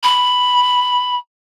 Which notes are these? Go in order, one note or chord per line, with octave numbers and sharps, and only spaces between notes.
B5